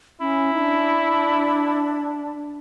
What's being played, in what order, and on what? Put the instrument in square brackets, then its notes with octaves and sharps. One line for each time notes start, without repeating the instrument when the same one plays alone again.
[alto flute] C#4 [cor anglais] E4
[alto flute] D#4
D4